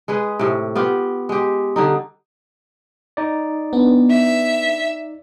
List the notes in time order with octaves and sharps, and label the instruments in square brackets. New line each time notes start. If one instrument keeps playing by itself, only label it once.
[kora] G#3 G#4 B4
A2 C3
B3 F4 G4
G#3 G4
D3 G3 D#4
[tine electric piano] D#4 D5
[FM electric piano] B3 D4
[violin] E5